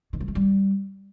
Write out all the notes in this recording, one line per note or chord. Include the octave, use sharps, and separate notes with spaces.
D#3
F3
A3
G3